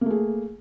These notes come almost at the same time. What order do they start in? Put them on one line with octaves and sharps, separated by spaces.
A#3 A3 G#4